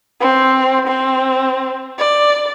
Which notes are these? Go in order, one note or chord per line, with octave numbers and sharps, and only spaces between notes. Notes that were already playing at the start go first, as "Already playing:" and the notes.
C4
C4
D5